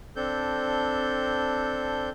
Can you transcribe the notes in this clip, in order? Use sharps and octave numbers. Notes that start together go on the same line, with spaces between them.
C4 D4 A4 G6